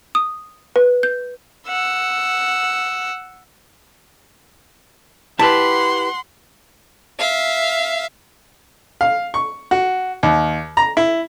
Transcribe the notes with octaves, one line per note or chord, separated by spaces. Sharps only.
D#6
B4
G6
F#5 E6
E4 G4 B4 F#5 A5 C6
E5 F5
F5
C#6
F#4
D#2
A#5
E4